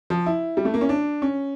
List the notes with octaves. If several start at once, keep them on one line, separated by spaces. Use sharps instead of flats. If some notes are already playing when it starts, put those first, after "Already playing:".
F3
E4
G3
A3
A#3
C#4
D4
C#4